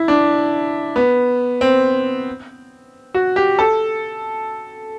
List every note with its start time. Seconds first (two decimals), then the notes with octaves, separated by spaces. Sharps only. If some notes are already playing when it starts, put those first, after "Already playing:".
Already playing: E4
0.08 D4
0.96 B3
1.61 C4
3.14 F#4
3.36 G4
3.59 A4